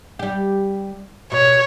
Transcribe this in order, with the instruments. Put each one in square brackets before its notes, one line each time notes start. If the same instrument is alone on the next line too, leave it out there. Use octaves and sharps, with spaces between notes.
[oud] G3 G4
[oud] B2 [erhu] C#5